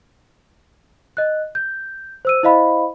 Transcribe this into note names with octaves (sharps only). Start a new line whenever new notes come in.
D#5 F#6
G6
C5 E6 D#7
E4 C5 D#5 F5 B5